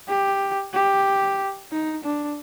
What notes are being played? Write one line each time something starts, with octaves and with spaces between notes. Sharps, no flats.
G4
G4
D#4
D4